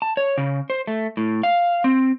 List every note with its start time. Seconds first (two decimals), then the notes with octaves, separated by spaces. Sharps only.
0.02 A5
0.17 C#5
0.38 C#3
0.70 C5
0.87 A3
1.17 A2
1.43 F5
1.84 C4